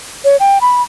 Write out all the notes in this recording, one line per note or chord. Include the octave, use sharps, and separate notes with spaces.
C#5
G5
B5